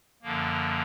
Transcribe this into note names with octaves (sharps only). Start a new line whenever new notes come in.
F#2 D3 F3 A#3